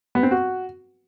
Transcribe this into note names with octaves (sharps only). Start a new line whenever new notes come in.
B3
C4
F#4